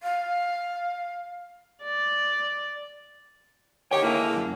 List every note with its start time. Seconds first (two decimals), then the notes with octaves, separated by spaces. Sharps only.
0.03 F5
1.83 D5
3.91 D#3 G4 C#5 G5
4.03 D3 G#3 A#3 E4 G#4
4.33 C#2 F#2